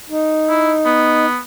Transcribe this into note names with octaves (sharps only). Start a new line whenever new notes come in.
D#4
E4
B3